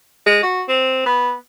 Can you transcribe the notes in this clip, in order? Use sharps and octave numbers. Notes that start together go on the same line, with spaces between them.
G#3
F#4
C4
B3